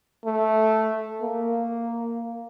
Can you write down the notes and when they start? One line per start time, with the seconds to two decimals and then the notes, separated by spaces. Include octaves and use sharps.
0.25 A3
1.22 A#3